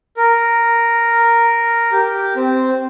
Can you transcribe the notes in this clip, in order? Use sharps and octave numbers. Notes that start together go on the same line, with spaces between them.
A#4
G4
C4